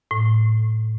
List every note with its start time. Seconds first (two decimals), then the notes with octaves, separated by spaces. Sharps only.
0.11 A2